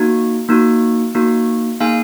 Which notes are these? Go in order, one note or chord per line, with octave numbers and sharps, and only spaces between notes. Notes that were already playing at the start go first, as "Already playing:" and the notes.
Already playing: A#3 D#4 F#4
A#3 D#4 F#4
A#3 D#4 F#4
A#3 D#4 G#4 F5 G#5